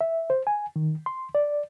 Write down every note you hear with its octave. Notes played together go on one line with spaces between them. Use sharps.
E5
C5
G#5
D#3
C6
D5